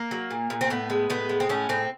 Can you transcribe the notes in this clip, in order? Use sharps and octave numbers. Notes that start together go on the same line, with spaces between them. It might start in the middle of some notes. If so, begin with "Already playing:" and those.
Already playing: A#3
F#3
A#2
A#2
C4
A2 B3
G#3
A2 B3
G#3
C4
A2 C#4
A2 C4